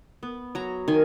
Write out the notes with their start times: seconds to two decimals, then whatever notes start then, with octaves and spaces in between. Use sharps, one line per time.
0.23 B3
0.55 F#3 A#5
0.88 D#3 G#5